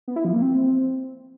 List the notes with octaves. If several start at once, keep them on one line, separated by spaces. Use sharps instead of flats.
B3
E4
F3
A#3
C4